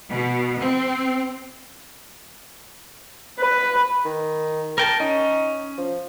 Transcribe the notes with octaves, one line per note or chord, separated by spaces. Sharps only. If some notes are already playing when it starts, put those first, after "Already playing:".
B2
C4
B4
D#3
A#4 G5 A5
C#4 D#4
F3